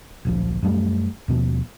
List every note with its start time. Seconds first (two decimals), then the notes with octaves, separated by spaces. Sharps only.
0.25 D1 A#1 F3
0.62 F#2 G3 A3
1.28 D#2 B2 F3